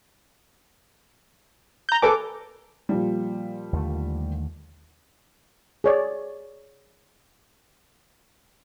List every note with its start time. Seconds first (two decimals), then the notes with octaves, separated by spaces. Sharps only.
1.89 A#5 G6
2.02 A4 B4 G#5 D6
2.89 A#2 F3 G3
3.73 D#2 D3 A3
5.84 G#4 C#5 D5